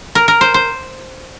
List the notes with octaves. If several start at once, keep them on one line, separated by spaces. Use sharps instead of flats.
A#4
A#4
C5
C5